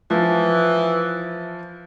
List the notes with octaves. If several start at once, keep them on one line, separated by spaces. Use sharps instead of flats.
E3 F3